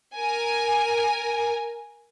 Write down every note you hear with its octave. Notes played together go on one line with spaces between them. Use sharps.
A#4 G#5